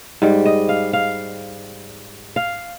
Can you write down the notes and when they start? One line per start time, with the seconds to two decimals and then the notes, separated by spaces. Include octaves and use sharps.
0.22 G#2 G3
0.45 D#5
0.69 F5
0.93 F5
2.36 F5